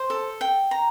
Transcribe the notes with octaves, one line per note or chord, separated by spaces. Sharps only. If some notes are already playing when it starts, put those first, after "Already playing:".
Already playing: C5
A4
G5
A#5